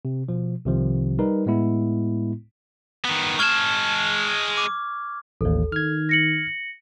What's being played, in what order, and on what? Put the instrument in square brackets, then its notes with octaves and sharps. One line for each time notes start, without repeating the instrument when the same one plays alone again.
[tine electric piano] C3
B2 F3
C2 C3 D#3 F3
G3 D#4 A#4 B4
A2 G#3 B3 E4
[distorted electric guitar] D#3 B3
[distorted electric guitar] G#3 A5 [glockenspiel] C#6 F6 G#6
[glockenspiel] D6
[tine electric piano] A1 D#2 [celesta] A4
[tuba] D#3 [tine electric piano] F6 G#6
[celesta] A#6 C#7 F#7